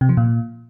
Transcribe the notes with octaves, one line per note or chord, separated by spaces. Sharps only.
C3
F3
A#2